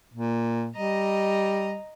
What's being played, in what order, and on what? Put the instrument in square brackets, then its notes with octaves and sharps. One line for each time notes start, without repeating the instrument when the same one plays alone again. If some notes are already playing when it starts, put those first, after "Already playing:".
[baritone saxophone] A#2
[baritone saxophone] G3 [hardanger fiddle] D#5 A#5